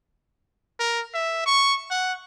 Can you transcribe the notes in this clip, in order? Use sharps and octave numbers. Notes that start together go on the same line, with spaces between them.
A#4
E5
C#6
F#5